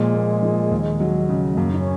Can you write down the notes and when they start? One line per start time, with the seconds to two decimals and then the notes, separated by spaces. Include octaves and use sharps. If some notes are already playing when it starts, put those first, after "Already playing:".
Already playing: A#2 F3 G#3
0.15 A#3
0.43 F3
0.71 D#2
1.00 F#3
1.29 C#3
1.51 G#3
1.57 F#2 A#3
1.72 D#4
1.79 C#4